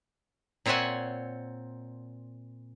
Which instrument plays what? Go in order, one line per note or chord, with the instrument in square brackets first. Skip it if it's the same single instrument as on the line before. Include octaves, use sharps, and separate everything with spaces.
[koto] A#2 C4 C#5 E5 F#5 G#5